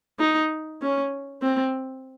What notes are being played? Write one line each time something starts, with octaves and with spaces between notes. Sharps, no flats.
D#4
C#4
C4